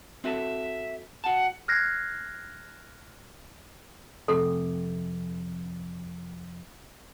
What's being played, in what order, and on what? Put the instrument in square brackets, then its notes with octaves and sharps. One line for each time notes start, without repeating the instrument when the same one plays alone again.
[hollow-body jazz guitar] C4 F#4 A4 [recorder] E5
[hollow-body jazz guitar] F#4 A5 [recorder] F#5
[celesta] F6 F#6 G#6 A#6 C7
[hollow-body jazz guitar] F2 C3 [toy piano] A4